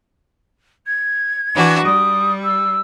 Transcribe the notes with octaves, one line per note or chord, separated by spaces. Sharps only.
G#6
E3 D4 F#4
G3 D#6
E6